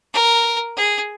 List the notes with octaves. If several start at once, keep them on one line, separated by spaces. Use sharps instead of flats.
A#4
G#4